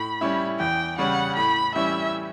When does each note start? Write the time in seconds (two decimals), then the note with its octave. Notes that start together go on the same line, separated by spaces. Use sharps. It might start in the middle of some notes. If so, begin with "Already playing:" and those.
Already playing: A2 B5
0.21 G3 C#4 E4
0.59 E2 G5
0.98 C#3 G3 C#4 F#5
1.36 A2 B5
1.75 E3 G3 C#4 E4 E5